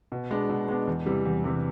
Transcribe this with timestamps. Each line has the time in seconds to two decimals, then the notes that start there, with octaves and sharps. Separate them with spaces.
0.12 B2
0.31 G#3 B3 D4
0.49 B2
0.68 G#3 B3 D4
0.87 E2
1.06 C3 E3 G3
1.25 E2
1.44 C3 E3 G3